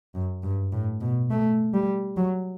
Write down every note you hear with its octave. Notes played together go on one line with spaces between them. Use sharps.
F#2
G2
A2
B2
A3
G3
F#3